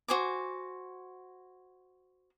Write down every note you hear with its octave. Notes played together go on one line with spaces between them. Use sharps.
F#4 C5 G#5 D6